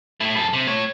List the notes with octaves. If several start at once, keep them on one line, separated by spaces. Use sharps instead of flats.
A3 E4
F#2 A4
C3
A3 C#5